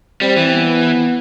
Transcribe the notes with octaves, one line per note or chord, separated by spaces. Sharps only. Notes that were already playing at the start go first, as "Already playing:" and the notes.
G3 C4
E3
B3